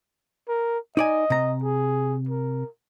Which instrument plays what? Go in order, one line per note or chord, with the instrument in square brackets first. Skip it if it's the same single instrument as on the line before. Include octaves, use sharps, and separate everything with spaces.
[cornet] A#4
[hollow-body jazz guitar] D#4 D5 G#5 [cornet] D#5
[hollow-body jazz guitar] C3 A#5
[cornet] G#4
A#4